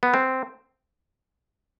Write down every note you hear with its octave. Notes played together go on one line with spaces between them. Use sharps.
B3
C4